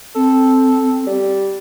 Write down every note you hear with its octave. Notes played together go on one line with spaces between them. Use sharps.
C4 A4
G3